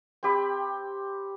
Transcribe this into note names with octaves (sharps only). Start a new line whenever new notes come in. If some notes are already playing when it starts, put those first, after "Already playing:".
C4 G4 B5